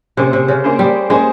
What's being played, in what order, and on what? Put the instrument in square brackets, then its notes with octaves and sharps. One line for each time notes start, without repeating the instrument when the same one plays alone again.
[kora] C3 [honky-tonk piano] A#3 C#4 G#4 C5
[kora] C3
C#3
[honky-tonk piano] A#3 C#4 G#4 C5
[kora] G3
[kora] G#3 [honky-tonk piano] A#3 C#4 G#4 C5